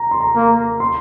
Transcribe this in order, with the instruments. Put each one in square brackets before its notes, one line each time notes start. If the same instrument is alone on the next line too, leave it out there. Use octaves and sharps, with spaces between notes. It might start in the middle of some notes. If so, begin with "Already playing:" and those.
Already playing: [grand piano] A#5
C6
A#5
[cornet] A#3
[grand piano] C6